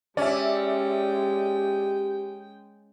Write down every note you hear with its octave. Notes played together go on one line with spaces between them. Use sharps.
G#3 C#4 G4 D5 E5 G5